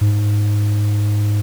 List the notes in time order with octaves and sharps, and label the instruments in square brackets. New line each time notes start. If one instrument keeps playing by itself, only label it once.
[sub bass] G#2